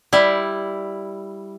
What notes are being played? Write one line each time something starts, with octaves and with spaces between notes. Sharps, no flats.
G3 E4